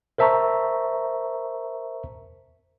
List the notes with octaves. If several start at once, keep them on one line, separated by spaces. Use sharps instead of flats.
A#4 C5 E5 A5 A#5 C#6